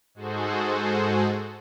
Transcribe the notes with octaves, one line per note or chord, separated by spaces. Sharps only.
G#2 G#3 F#4 G#4 A4 C5